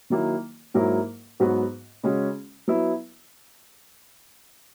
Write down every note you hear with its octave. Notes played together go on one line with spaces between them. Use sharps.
D#3 F#3 A#3 E4
G#2 F#3 A#3 E4 A#4
G#2 F#3 B3 F#4 B4
C#3 G#3 C#4 F#4
F#3 B3 E4